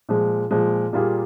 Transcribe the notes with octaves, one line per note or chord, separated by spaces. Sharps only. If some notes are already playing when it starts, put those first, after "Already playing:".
A#2 F3 G#3
A#2 F3 G#3
A#2 G3 A#3 F4 G#4